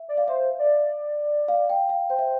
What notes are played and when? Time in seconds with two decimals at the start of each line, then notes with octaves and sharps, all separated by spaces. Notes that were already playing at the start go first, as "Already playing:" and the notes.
Already playing: E5
0.09 D5
0.17 F5
0.28 C5 E5
0.59 D5
1.48 F5
1.70 G5
1.89 F5
2.10 C5 G5
2.19 E5